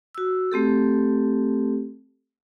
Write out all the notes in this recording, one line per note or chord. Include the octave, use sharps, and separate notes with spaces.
F#4 E6
A3 C4 G4 A4